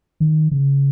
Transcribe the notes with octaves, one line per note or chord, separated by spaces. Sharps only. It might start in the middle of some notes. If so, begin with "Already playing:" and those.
D#3
C#3